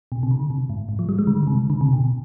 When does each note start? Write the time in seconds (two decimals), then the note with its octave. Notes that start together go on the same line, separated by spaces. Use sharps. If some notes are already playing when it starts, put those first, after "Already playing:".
0.12 B2
0.23 C3
0.31 D3
0.50 C3
0.70 G#2
0.89 G#2
0.99 F3
1.09 G3
1.19 G#3
1.27 D3
1.43 D3
1.47 C3
1.70 D3
1.81 C3
1.93 B2